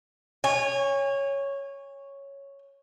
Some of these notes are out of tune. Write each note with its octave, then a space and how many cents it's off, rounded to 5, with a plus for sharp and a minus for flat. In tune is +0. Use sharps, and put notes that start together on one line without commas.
C#5 +0 G#5 -30